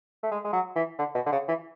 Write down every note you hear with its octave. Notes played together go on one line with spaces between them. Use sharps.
A3
G#3
G#3
F#3
E3
D3
B2
D3
C#3
E3